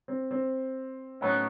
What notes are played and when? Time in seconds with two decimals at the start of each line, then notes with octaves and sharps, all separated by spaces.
0.08 C4
0.31 C4
1.21 A2 F#3 B3 C#4 D#4